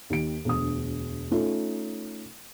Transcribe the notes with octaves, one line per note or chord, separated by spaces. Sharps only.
D#2 D#3 D7
E1 D2 D#6
A3 C#4 D#4 F4 A4